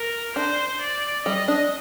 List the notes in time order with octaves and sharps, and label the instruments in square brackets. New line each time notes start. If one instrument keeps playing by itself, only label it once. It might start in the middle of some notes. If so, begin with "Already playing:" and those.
Already playing: [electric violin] A#4
[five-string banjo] D4 [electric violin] C5
[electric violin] D5
[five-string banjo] G3 [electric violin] D#5
[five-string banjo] D4